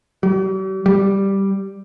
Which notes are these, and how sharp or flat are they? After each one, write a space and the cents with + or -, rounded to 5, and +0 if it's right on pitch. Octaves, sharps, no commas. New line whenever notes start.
G3 -45
G3 +0